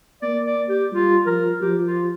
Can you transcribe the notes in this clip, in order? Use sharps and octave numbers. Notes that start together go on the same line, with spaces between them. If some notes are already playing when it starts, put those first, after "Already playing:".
A#3 D5
D5
G4
G3 F4
F3 A#4
F3 G4
F4